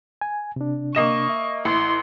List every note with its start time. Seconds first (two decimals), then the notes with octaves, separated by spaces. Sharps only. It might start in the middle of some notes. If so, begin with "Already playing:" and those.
0.21 G#5
0.56 C3 D4
0.95 A#3 D#5 C#6 E7
1.29 E5
1.65 A1 E4 C6